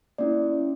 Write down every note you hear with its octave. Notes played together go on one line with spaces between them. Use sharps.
A#3 C#4 E4 D5